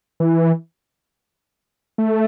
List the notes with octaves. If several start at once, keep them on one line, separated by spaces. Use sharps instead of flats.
E3
A3